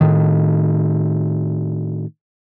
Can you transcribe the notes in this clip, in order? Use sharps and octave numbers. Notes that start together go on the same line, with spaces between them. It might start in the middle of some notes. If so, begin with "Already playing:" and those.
A2 D#3